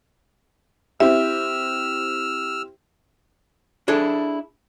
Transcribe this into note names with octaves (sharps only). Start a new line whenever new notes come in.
C4 E4 G4 E5 E6 F6
D4 E4 G#4 A4